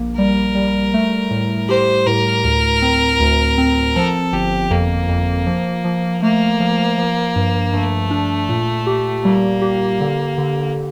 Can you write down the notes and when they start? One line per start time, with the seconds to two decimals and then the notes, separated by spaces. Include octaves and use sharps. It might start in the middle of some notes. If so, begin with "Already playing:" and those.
Already playing: A#1 A#3
0.17 G3 A#4
0.55 G3
0.94 A3
1.30 A2
1.69 G4 C5
2.07 A2 A#4
2.44 D2
2.82 C4
3.20 D2
3.58 C4
3.96 F3 A4
4.33 G1 G4
4.70 F2 A#3
5.09 F2
5.47 F3
5.84 F3
6.22 A3 A#3
6.60 F3
6.98 F3
7.36 G2
7.73 G2 A3
8.10 D4
8.49 A#2
8.87 G4
9.24 G3 A#3
9.62 G4
10.00 D3
10.38 D3